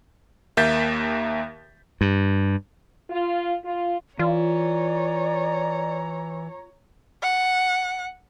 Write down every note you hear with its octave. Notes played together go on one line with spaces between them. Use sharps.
D#2 A#3 E5 G6 A6 B6
G2
F4
F4
E3 F4 C#5 D5 A#5
F#5